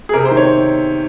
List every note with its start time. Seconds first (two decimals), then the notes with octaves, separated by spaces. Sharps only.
0.09 G#4
0.13 C3 A#4
0.25 C5
0.31 D#3
0.37 C#5